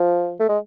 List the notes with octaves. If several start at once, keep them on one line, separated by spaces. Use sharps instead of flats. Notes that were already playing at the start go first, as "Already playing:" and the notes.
Already playing: F3
A3
G#3